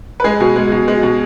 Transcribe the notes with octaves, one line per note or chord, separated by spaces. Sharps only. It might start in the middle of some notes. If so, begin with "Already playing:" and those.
B4
G#3 G#4
B2
G#3
B2
G#3
B2